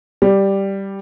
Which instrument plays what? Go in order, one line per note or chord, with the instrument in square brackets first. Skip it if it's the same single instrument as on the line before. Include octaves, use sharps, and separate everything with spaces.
[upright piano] G3